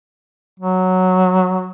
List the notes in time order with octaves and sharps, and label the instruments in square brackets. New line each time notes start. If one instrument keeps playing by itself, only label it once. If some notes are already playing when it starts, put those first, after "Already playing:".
[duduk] F#3